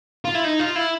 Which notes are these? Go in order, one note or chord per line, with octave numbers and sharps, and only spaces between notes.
F4
E4
D#4
F4
E4